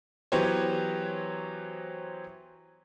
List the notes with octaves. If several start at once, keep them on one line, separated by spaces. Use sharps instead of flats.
E3 F#3 B3 G4 C5 C#5